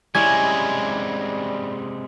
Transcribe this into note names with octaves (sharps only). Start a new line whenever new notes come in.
C3 G3 G#3 C#4 E4 D#5 G#6